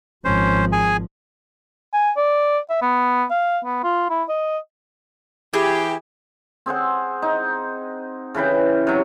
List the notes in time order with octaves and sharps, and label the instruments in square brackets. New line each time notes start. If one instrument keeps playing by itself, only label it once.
[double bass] G#1 F3 [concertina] C#4 C5
[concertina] G#4 G#5
[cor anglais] G#5
D5
E5
B3
F5
B3
F4
E4
D#5
[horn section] E3 G4 [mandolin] G#4
[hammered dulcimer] C4 G#4 C5 F#5
D#4
C#3 E3 B4 G5
C3 F#3